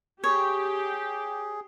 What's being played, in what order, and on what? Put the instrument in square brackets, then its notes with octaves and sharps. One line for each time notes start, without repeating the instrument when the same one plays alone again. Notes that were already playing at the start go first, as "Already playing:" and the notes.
[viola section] G4 [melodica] G#4 [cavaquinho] C#5